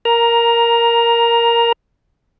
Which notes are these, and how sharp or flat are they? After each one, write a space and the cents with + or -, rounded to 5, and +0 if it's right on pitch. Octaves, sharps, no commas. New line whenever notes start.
A#4 +0 A#5 +15